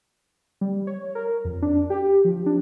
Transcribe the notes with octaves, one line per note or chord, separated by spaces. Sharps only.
G3
C#5
A#4
F2
D4
G4
F3
D4